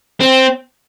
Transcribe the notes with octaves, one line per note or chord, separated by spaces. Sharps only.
C4